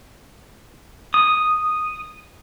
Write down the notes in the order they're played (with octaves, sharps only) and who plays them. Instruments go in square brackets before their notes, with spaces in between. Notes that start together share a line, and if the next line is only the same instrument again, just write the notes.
[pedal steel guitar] D#6